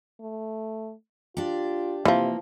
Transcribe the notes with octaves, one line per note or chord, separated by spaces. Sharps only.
A3
D4 F4 G4
C3 E3 F3 A#3